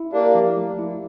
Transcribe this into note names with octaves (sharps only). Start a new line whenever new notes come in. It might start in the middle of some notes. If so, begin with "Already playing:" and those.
Already playing: E4
A#3 D4 G4
F3
A3
E4